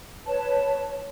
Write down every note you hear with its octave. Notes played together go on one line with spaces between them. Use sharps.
B4 C#5 A5